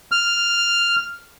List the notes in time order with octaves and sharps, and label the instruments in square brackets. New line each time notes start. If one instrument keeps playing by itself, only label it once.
[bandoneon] F6